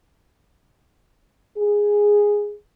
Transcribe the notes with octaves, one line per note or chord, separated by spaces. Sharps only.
G#4